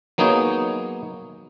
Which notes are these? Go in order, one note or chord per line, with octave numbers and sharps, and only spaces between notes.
F#3 A#3 B3 D#4 G#4 C#5